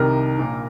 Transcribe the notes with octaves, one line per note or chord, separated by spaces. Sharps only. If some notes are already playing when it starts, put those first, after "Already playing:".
Already playing: C2 C3 D#3 A#4
A#1 A#2